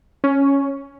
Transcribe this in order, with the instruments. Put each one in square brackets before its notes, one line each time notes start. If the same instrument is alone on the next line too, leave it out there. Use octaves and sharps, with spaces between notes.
[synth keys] C#4